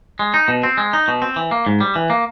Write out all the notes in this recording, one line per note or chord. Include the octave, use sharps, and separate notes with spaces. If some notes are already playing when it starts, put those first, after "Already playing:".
G#3
D#4
B2
C4
G#3
D#4
B2
C4
E3
A#3
G#2
G3
E3
A#3